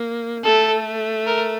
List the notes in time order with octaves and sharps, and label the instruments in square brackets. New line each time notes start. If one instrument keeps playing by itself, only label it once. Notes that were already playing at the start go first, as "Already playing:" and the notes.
Already playing: [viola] A#3
[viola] A3 [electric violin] A4
[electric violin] A#4